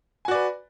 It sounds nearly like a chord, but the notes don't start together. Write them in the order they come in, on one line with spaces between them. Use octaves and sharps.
G#5 F#4 D5 B4